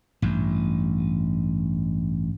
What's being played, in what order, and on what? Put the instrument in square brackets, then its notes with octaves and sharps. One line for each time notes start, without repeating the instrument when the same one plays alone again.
[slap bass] A1 G2